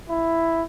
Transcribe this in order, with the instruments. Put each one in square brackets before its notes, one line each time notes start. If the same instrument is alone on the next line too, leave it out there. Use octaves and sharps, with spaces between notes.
[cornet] E4